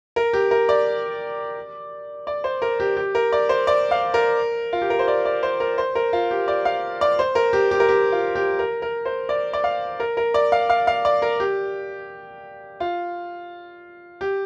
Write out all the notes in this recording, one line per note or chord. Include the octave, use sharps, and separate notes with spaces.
A#4
G4
A#4
D5
D5
C5
A#4
G4
G4
A#4
D5
C5
D5
F5
A#4
F4
G4
A#4
C5
D5
D5
C5
A#4
C5
A#4
F4
G4
D5
F5
D5
C5
A#4
G4
G4
A#4
G4
F4
G4
A#4
A#4
C5
D5
D5
F5
A#4
A#4
D5
F5
F5
F5
D5
A#4
G4
F4
G4